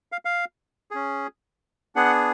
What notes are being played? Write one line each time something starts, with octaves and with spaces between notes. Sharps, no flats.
F5
F5
C#4 G#4
B3 D4 G#4 F#5